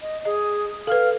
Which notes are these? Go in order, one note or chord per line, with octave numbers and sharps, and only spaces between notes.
D#5
G#4 D#5
A4 B4 F5